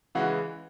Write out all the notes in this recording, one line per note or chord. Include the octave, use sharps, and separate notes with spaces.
C#3 E3 G#3 F#4